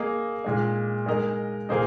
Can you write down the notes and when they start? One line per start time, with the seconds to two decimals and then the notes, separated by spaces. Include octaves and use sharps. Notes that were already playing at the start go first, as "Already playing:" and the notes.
Already playing: A#3 G#4 D#5
0.44 A#2 G#3 D#4
1.06 G#3 D#4 A#4 D#5
1.69 A#2 A#3 G#4 C5 D#5